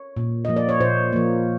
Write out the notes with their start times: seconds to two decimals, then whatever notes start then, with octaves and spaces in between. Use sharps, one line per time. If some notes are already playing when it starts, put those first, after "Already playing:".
Already playing: C#5
0.17 A#2
0.45 F3 A#3 D#5
0.56 D5
0.69 C#5
0.80 A#2 C5
1.13 F3 A#3